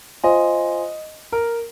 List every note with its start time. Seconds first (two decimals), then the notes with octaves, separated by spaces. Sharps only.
0.24 F4 C5 D#5 F5 G#5 C6
1.32 A#4